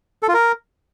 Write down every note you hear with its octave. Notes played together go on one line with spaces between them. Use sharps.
A4
F4
A#4